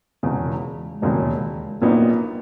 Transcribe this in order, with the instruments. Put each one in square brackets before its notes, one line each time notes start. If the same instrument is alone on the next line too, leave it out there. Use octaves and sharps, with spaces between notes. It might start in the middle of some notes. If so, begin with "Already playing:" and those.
[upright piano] E1 E2 C#3 [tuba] G#3
[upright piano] E1 D#2 C#3 F#3 [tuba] G#3
[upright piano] A#1 A#2 F#3 B3 D#4 [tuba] A#3